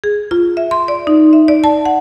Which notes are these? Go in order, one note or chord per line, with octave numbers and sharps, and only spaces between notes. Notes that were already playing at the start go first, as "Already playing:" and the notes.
G#4
F4
E5
C6
D5
D#4
E5
D5
A5
F#5